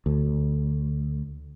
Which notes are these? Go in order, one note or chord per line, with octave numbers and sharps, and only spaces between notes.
D2